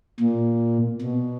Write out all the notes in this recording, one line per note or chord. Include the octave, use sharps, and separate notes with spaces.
A#2
B2